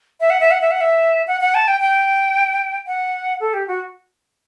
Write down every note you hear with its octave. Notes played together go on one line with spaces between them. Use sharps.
E5
F#5
E5
F#5
E5
F#5
E5
F#5
F#5
A5
G5
G5
F#5
A4
G4
F#4